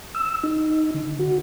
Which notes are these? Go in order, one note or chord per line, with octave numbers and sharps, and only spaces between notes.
E6
D#4
D3
F#4